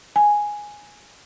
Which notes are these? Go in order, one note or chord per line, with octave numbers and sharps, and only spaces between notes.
G#5